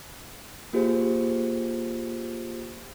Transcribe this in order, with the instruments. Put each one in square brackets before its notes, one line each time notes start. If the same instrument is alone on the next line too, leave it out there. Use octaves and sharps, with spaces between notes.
[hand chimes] A#3 F4 G4 G#4 C5